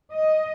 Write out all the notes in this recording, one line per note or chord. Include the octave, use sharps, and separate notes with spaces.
D#5